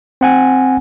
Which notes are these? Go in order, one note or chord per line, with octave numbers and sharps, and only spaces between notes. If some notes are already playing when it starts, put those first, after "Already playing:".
C4 F#5 G#5